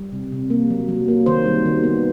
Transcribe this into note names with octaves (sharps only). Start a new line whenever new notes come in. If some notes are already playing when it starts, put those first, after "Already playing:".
Already playing: G3
C3
C3
A#3
F#3
F#3
A#3
D#3 C5
G3
D#3
B3